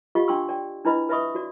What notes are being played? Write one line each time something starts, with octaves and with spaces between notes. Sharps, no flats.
F4 G4 D#5 F5 F#5 C#6
D4 G5 C6 C#6 E6
D5 G5
D4 E4 B4 D#5 B5
B4 D#5 E5 B5 C#6 D#6
F#4 D5